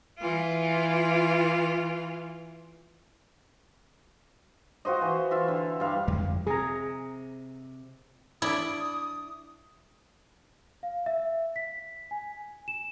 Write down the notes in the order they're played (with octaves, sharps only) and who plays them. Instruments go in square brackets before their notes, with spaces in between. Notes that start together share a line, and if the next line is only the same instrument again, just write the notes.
[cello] E3 F4
[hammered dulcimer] F4 F#4 C5 D#5
E3
F4 E5
D3
G2 F5
[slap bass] G1 F2 G#3
[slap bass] C3 [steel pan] G#4 A#5
[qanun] D4 D5 C#6 [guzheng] E4 [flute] D#6
[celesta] F5
E5
B6
G#5
E7